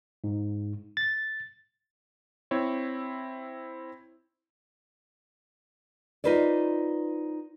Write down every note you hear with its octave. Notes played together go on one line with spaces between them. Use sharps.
G#2
A6
C4 E4 C#5
D#4 F4 B4 C5 D5